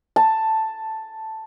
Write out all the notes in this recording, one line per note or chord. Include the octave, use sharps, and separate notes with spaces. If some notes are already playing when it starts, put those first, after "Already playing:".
A5